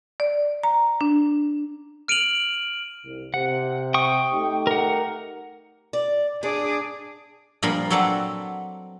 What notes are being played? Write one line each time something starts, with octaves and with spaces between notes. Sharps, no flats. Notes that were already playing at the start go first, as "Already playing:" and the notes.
D5
A#5
D4
F6 D7 D#7 F7 F#7
C2
C3 F#5
G5 C#6 D#6
A3 D#4 G4
A#4 F#5
D5
D4 G#4 D5
G2 A#2 F3 A#4 B5
F#3 C4 A4 B4 D5 A#5